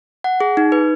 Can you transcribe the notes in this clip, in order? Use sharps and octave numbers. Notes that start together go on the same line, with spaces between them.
F#5
G#4
D#4
B4